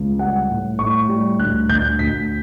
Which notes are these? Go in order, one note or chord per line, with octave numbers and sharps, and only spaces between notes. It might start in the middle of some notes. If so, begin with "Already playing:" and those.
Already playing: C#2
G3 F#5
A2
A2 C#6
G3
D2 F#6
D2 G6
D2 B6